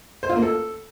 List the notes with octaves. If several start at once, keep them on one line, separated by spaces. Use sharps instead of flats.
C5
F4
A#3
A4